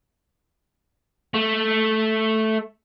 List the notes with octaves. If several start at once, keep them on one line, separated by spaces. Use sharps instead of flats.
A3